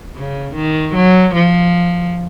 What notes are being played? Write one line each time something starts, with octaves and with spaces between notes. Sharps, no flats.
C#3
D#3
F#3
F3